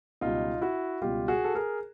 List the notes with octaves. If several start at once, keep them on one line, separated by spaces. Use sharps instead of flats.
C#2 B2 G3 D#4 F4
E4 F#4
C#2 B2 G3 F4 G4
F#4 G#4
A4
G#4 A#4